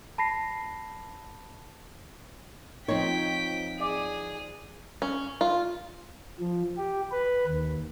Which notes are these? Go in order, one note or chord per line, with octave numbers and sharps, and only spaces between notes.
A5 B5 A#6 C7
F3 C4 D#4 C#5 G5 B6
G#4 D5
C#4
F4
F3
G4
B4
D#2